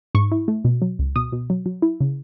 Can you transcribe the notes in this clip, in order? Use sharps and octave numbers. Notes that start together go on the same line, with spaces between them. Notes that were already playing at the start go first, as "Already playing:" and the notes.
G#2 C#6
E4
A3
B2
F#3
C#2
B2 D#6
B2
F#3
F#3
E4
C#3